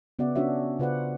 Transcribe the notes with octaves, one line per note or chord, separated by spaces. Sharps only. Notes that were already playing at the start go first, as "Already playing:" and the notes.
C#3 B3 F#4 D5 E5 F#5
C#4 D4 F4 F#4 C#5 E5
C#3 F4 B4 C5 D5 F#5